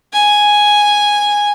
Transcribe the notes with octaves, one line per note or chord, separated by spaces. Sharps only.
G#5